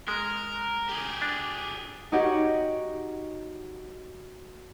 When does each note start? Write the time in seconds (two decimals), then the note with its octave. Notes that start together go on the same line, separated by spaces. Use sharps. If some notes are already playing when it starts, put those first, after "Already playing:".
0.08 G#3 A#4
0.89 G4 G#4
1.22 D4
2.12 D#4 F#4 G4 C#5 F#5